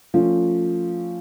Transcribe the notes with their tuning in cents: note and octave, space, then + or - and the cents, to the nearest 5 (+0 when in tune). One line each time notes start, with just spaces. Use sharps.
F3 +0 A3 +20 C#4 +0